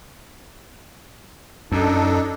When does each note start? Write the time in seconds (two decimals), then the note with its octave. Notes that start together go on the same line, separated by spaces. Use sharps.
1.72 F#2 D4 D#4 A4